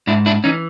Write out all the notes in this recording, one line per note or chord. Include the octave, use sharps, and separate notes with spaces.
G#2 D4 E4
D4 E4
E3 C#4 D#4